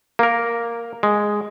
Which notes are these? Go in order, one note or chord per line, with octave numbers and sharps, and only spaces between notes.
A#3 A#4
G#3